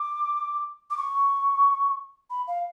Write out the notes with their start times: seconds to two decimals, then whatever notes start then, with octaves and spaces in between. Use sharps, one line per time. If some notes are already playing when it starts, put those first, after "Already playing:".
Already playing: D6
0.91 D6
0.98 C#6
2.30 B5
2.48 F5